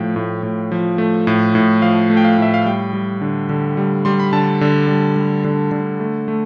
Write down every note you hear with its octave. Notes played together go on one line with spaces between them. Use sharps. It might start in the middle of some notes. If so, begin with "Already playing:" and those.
Already playing: A2 F3 A3 F5 G5
A2
A2
F3
A3
A2
A2
F3 F5
A3
G5
F5
A2 E5
F5
G3 G5
G3
D3
D3
G3
G3 C6
B5
D3 A5
D3
G3
G3
D3
D3
A3
A3